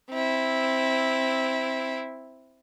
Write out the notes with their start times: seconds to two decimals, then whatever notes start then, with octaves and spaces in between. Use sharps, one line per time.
0.11 C4 E4